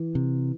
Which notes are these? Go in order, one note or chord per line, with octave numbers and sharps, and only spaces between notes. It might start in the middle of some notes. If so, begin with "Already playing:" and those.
Already playing: E3
C3